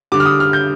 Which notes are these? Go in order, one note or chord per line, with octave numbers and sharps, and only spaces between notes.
D3 G3 D6
F6
D#6
F6
G6